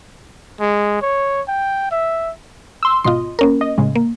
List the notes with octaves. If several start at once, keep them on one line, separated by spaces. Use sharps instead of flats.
G#3
C#5
G5
E5
C6 E6
G#1 B2 F4 D#5 C6
A#3 C#4 A#4
D#5
A2 C#3 G#3
A#3